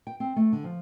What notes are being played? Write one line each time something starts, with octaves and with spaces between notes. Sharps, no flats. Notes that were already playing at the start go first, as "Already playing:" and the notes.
G5
C4
A3
D3
F3